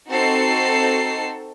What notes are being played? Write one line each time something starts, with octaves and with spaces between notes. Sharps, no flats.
C4 D#4 F#4 A4 C7